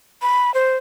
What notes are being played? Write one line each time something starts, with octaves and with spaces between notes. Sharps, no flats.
B5
C5